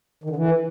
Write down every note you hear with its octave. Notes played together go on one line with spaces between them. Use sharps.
D#3
D3
E3